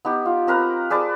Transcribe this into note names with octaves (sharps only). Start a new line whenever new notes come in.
B3 D#4 G4
F4
C4 A#4 B4 A#5
G#4 B4 D5 A5